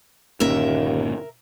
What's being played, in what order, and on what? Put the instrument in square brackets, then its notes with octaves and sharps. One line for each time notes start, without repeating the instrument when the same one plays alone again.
[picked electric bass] G1 A#2 C#4 [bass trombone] D#2 [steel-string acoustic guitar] A#4 E5